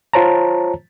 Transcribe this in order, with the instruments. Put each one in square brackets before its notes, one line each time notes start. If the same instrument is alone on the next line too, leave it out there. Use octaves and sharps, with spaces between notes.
[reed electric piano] F4 C5 C#5 A5 A#5